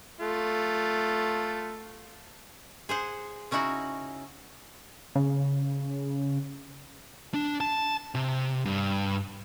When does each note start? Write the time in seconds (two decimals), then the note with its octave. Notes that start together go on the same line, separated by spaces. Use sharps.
0.20 A3 F4
2.89 G#4 C5 F#5
3.51 C#3 C#4 D#4 E4 F#4 F#5
5.15 C#3
7.34 D4
7.61 A5
8.15 C3
8.65 G2